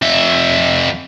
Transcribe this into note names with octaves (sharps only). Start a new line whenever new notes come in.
F2 E5